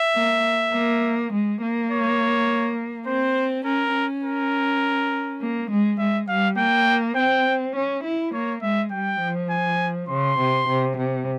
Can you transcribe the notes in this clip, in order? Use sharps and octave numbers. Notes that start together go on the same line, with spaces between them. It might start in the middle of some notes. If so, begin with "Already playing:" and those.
Already playing: E5
A#3
A#3
G#3
A#3
C#5
C4 C5
C#4 A#4
C#4
A#4
A#3
G#3
G#3 E5
G3 F5
A#3 G5
C4 G5
C#4
E4
A#3 C#5
G#3 E5
G3 G5
F3
G#5
C#3 C6
C3
C3
C3